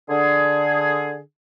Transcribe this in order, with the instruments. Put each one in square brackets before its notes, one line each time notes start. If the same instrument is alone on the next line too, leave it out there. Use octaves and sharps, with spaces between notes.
[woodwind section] D3 G#4